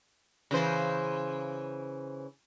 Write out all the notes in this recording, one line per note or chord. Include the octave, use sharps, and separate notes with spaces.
C#3 E3 C5